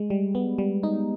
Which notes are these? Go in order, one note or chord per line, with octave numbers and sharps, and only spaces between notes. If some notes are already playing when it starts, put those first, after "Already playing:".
Already playing: G#3
G3
B3
G3
D#4